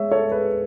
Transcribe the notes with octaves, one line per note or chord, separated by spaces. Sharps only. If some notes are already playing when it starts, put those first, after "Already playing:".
Already playing: G#2 G#4 C#5 E5
A4 C#5
G#4 B4